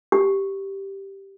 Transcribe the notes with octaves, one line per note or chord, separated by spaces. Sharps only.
G4